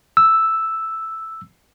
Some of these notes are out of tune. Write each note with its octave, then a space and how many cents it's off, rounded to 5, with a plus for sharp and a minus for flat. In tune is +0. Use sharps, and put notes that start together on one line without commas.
E6 +0